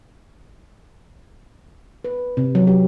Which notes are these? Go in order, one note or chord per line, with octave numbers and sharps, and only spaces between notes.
B4
C3
F#3
G4